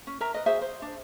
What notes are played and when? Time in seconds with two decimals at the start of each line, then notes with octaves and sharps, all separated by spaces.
0.07 C#4
0.21 A#4 E5 A#5
0.34 B4 D#5
0.46 F#4 G#4 C5 E5
0.61 C5
0.82 D4